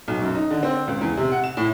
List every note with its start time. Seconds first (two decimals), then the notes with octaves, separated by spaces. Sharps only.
0.08 B1
0.21 F#2
0.35 D#4
0.50 D3
0.63 C4
0.87 C#2
1.01 E2
1.17 C3
1.32 F#5
1.44 E7
1.57 A2